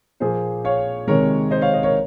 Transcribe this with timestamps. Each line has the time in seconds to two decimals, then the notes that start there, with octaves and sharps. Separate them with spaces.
0.20 A#2 F3 A#3 G#4 C5
0.65 C#5 F5
1.07 C3 D#3 G#3 A#4 C#5
1.51 C5 D#5
1.61 C#5 F5
1.73 C5 D#5
1.83 A#4 C#5